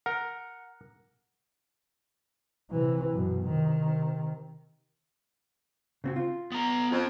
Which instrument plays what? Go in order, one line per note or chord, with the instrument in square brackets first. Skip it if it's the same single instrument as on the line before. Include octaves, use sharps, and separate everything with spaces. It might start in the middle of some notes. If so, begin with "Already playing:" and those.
[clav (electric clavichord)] A#4 [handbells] F#5
[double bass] C3 E3
F#2 B2
C3 D#3
[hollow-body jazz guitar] C#3 C4 F#4
F4
[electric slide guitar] B3 A#5
[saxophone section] F2